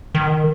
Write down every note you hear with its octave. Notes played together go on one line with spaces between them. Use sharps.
D#3